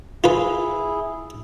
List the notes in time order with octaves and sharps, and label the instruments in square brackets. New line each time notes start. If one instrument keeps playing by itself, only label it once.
[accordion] E4 G#4 [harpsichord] F4 B4